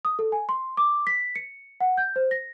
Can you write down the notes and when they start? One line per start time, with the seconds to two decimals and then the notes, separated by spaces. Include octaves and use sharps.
0.05 D#6
0.19 A4
0.32 G#5
0.49 C6
0.77 D6
1.07 B6
1.35 C#7
1.80 F#5
1.97 G6
2.16 C5
2.31 A#6